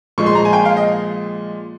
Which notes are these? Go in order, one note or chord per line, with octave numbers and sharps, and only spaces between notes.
A#2 F3 G#3 C#6
C6
A#5
G#5
G5
F5
D#5